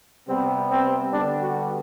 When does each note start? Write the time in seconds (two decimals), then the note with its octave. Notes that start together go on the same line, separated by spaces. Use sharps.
0.28 C3 G3 B3 C4
0.70 C4
1.13 D3 G3 B3 D4
1.41 F#4